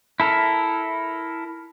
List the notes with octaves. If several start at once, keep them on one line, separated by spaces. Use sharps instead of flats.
E4 A4 A#4